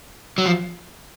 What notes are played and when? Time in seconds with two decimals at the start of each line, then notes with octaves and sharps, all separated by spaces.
0.38 F#3
0.46 F3